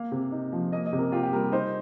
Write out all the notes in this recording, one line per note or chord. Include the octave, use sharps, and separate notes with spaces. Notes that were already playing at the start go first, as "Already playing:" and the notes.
Already playing: A#3 F5
C3
D#4
F3
A#3 D#5
D#5
C3
A#4
F4 G4
G4
G3 A#4
D#4 C5